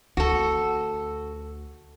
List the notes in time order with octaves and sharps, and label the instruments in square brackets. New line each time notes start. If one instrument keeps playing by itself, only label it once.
[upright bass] D2 [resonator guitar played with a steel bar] F#4 A4